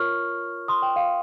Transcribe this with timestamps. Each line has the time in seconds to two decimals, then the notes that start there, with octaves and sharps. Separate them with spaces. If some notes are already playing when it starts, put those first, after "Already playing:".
Already playing: F4 A#4 C#5 C#6 F6
0.68 C6 D#6
0.82 G5
0.96 F5